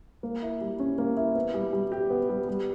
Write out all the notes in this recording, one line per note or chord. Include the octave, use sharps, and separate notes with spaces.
A#3
E4
G3
C#4
A#3
E4
B3
G3
G3
G4
B3
G3
G3